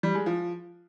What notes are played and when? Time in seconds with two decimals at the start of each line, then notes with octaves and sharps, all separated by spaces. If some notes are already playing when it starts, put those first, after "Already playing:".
0.03 G3
0.15 G#3
0.26 F3